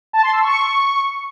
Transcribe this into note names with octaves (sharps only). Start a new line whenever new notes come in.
A5
C6
E6
C#6